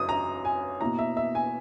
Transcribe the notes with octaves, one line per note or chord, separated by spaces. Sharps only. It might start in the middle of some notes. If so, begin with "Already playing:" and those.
Already playing: F#2 C#3 C#4 D#6
A#5
G#5
B2 A#3 E4 A#5
E5
E5
G#5